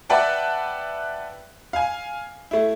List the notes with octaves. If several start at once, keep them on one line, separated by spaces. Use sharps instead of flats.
B4 D5 E5 F#5 G5 A5
F5 G#5
A3 E4